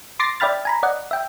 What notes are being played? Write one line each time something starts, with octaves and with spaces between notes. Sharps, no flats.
C6 D6 A6 A#6 C7
D5 E5 G5 B5 F6 A6
G#5 A#5 B5
D5 D#5 F#5
E5 G5